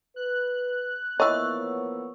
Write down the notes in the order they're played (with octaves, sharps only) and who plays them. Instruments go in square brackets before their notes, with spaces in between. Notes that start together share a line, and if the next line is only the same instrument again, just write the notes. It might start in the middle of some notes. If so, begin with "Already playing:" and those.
[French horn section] B4 [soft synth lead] F#6
[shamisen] E3 D#5 [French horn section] F3 A#3 B3 [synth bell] C#5 C#6 E6